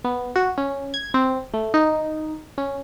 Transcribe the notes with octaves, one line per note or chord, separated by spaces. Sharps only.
B3
F#4
C#4
G#6
C4
A3
D#4
C#4